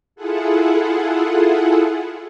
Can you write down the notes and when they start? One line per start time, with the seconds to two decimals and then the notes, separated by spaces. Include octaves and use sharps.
0.16 E4 F4 G#4 A4 F#5